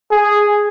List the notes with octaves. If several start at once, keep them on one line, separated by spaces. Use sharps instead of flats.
G#4